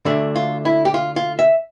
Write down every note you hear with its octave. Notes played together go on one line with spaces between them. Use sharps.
D2 D3 A3 D4
F4
E4
G4
F4
F4
E5